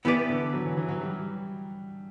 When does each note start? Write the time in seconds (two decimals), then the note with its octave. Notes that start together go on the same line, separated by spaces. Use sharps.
0.05 E3 B3 E4 G4 B4 D5
0.30 D3
0.53 F#3
0.65 E3
0.77 E3
0.89 F#3
1.01 G3